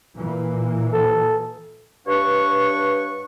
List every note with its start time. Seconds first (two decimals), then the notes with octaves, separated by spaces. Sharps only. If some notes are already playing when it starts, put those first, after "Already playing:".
0.15 A#2 E3 A#3
0.93 A4
2.08 G2 D4 B4 C#5 F#5 C#6